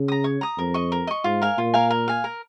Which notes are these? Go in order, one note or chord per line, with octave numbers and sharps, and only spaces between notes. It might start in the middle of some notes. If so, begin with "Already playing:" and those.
Already playing: C#3
A#5 D#6
C#5
A#5 D#6
F2 A#4
D#5 C#6
A#4
D#5 C#6
G#2 F4
A#4 F5 G#5
A#2 F4
A#4 F5 G#5
A#4
F5 G#5
A#4